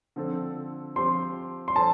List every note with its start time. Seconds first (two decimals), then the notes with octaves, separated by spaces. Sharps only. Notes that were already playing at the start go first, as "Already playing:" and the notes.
0.16 D3 F3 C4 A4
0.96 F3 C4 G4 C5 C6
1.68 C6
1.75 F3 D4 A4 C5 A5